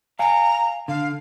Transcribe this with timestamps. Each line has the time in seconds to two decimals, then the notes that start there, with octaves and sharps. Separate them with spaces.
0.19 F5 G#5 A#5
0.88 D3 F5